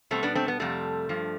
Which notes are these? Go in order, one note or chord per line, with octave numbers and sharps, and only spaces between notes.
B2 G3 A3 C4
B3 D4
A3 C4
B3
F2 C3 G3 A3
G2 F3